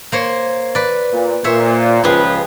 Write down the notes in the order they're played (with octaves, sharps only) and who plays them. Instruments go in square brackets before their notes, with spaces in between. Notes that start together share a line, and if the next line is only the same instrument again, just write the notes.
[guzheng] A#3 C5 C#5
B4 D5
[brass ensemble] A#2
[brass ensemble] A#2 [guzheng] C5 C#5 E5
[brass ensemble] C#2 F3 B4 [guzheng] G4 G#4